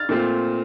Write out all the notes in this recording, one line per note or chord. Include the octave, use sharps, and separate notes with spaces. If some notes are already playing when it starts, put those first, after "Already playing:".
Already playing: F6 A6
A#2 A3 C4 F4